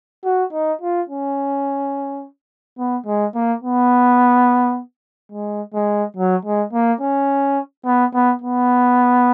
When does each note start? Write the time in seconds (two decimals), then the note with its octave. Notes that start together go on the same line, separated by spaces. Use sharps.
0.25 F#4
0.53 D#4
0.82 F4
1.09 C#4
2.78 B3
3.06 G#3
3.35 A#3
3.63 B3
5.32 G#3
5.74 G#3
6.17 F#3
6.45 G#3
6.73 A#3
7.01 C#4
7.85 B3
8.14 B3
8.42 B3